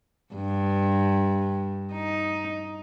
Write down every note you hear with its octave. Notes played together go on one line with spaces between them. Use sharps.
G2
D#4